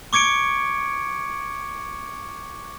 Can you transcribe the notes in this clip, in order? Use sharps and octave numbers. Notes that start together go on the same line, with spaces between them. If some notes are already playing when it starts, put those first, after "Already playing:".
C#6 D6 G#6 C#7 D7